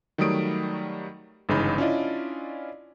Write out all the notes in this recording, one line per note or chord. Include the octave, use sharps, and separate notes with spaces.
D#3 F#3 G3 A3 D#6 D7
G1 G#2 C#3 E3 D#4 B5
C#4 D4 E4 F4 D5 D#5